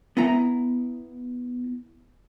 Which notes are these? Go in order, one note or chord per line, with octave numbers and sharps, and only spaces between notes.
B3 E4 A#5